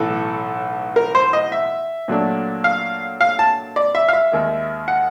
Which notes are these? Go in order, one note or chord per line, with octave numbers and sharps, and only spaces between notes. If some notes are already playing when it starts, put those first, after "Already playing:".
Already playing: B1 A2 E3 A4
A#4
C5
D#5
E5
A#2 F#3 A3 D4
F5
F5
A5
D5
E5
F5
E5
D#2 D#3 G#3
F#5